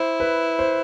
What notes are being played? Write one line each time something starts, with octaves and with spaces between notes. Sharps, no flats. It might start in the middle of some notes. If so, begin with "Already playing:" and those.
Already playing: E4 C5
B4
C5